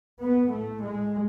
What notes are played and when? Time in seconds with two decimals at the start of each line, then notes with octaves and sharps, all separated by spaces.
0.20 A2 B3
0.51 A3
0.83 G#3